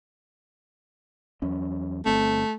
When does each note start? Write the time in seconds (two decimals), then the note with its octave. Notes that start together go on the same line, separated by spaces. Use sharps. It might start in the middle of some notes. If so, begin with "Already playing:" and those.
1.42 E2 F#3 C#4
2.06 G1 A3 C4